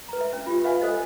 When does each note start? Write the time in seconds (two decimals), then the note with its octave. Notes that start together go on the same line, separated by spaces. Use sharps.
0.09 B4 A#5
0.21 E5
0.33 C#4
0.46 F4 G4
0.64 B4 E5 F5 G#5
0.81 A4 C5 D#5